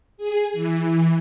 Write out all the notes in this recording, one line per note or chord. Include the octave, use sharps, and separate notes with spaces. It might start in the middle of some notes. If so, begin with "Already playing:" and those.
G#4
E3